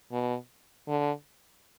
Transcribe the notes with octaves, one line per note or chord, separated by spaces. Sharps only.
B2
D3